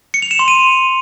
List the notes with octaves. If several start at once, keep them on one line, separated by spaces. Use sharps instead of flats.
C#7
F7
E7
C6
D#7